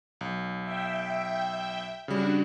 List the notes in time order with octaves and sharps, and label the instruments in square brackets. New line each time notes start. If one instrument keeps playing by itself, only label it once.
[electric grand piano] B1
[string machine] E5 G5
[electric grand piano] C#3 G3 [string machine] D4 F#4